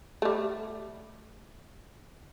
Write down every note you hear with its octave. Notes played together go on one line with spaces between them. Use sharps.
G3 A3